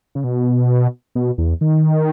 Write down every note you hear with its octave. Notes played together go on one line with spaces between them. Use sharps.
C#3
B2
B2
E2
D#3